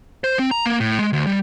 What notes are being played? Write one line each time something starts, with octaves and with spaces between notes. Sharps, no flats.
C5
C4
A#5
A#3
A2
G#3
D2
G3